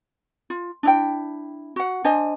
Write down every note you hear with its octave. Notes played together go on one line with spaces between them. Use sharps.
F4
D4 E4 G5
F#4 F#5
D4 C5 D#5 G#5